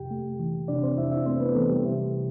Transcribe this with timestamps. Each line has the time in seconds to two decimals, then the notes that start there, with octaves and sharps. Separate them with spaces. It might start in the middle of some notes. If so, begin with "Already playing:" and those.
Already playing: F2 C3 G4 G5
0.11 A3
0.39 E3
0.68 C3 D4 D5
0.83 C4 C5
0.97 F2 E4 E5
1.11 E4 E5
1.26 A3 C4 C5
1.40 B3 B4
1.55 E3 A3 A4
1.69 G3 G4
1.84 C3